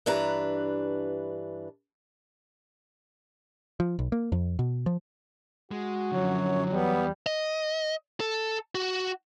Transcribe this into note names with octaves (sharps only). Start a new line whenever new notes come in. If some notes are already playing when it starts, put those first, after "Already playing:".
G2 E3 D4 B4 A#5
F3
B1
A#3
F2
B2
F3
G#3 F#4
F#2 D3 F3 F#3 C#5
E2 G3 B3
D#5
A4
F#4